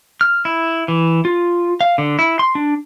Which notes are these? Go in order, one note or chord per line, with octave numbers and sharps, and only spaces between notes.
F6
E4
E3
F4
F5
D3
E4
C6
D4